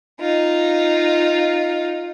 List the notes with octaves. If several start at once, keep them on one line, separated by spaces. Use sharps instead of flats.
D#4 F4